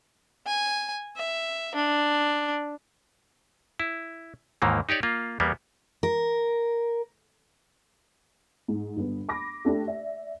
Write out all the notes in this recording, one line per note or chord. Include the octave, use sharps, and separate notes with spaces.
G#5
E5
D4
E4
D#2 G#2 D#3 E3 A#3
D#4 G4 C#5 D5
A#3 F4
E2 G3 A#3 B3
A#4
G#2
G1 B3
B5 D6 A#6
A3 D4 G4
D5 E5